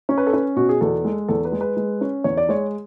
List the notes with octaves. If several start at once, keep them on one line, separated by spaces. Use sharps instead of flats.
C#4
B4
A4
C#4 B4
B2 F#4
G#4
E2 A4
G#3
E2 A4
B4
G#3
B4
G#3
C#4
E2 C#5
D5
G#3 C#5